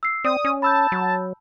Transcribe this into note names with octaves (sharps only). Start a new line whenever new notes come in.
E6 C7
C4 D5 D#6
C#4
A5 B5 E6 G6
F#3